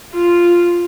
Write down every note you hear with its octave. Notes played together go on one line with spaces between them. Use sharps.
F4